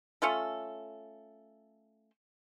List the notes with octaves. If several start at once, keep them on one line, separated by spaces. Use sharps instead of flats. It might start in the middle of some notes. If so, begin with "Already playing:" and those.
A3 C#4 F4 A4